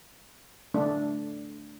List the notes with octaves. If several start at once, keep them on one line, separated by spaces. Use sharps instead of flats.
A3 D4